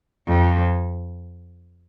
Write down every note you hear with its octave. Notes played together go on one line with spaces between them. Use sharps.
F2